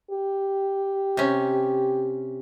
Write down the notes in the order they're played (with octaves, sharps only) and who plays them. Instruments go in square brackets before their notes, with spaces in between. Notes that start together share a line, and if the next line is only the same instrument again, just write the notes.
[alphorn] G4
[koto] C3 C#4